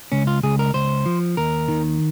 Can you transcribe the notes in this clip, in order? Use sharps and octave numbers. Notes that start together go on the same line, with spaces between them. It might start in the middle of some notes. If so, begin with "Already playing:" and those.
C#2 C#4
F4
C#2 G#4
A#4
C#2 C5
F3
D#2 A#4
D#3